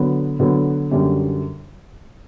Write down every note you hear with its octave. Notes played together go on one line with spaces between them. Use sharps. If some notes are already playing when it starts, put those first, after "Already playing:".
Already playing: D3 F#3 B3
D3 F#3 B3
F#2 D3 G3